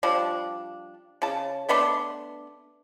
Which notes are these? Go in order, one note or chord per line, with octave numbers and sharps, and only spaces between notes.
F3 G3 D4
C#3 A5
A3 B3 D4 C6